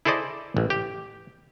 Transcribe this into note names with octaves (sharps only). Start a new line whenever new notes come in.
E4 G#4 A4 C5 D5 D#5
A1
G4